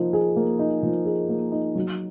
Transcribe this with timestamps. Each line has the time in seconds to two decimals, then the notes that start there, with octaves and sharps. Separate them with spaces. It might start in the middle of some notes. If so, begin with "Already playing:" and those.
Already playing: F3 A#3 D#4
0.13 G#4
0.36 A#3
0.59 D#4
0.83 F3
1.06 G#4
1.29 A#3
1.52 D#4
1.75 F#3